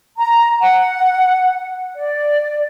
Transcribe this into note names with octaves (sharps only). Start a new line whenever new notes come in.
A#5
F#5
D5